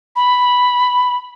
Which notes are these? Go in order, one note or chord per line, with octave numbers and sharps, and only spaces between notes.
B5